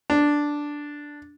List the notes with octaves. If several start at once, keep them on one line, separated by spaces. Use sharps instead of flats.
D4